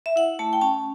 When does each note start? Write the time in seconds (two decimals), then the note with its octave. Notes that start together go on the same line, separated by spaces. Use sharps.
0.06 E5
0.16 E4 F#5
0.39 A3 A5
0.53 G5
0.61 C#4 A5